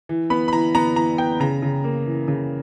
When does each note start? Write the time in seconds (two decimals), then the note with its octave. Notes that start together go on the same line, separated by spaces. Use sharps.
0.09 E3
0.30 B3 B5
0.48 B5
0.53 E3 A#5
0.75 B3 A#5
0.96 E3 A#5
1.18 B3 G5
1.40 C#3 A#5
1.62 C#3
1.84 A#3
2.06 E3
2.28 C#3